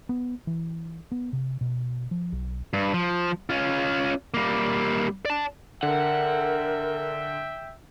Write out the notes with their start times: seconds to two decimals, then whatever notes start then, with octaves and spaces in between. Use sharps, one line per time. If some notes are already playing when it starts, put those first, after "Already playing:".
0.09 B3
0.47 E3
1.12 B3
1.33 C3
1.61 B2
2.11 F3
2.32 B1
2.73 G2
2.94 F3
3.50 C#4 F4
4.34 G3 A#3
5.25 D5 A5
5.83 D3 A#4 E5 F#5 G5